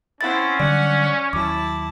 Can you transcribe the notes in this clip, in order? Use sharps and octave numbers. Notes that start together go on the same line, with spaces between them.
C4 C#4 E4 F#5 A6
D3 F#3 G3 D5 F#5
D#2 F#3 E4 A5 D6